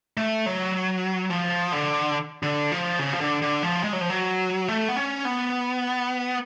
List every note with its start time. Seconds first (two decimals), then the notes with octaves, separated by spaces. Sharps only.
0.17 A3
0.46 F#3
1.30 F3
1.72 D3
2.43 D3
2.72 F3
2.99 C#3
3.13 F3
3.21 D3
3.42 D3
3.63 F3
3.84 G#3
3.93 F#3
4.01 F3
4.10 F#3
4.68 A3
4.89 B3
4.96 C#4
5.25 B3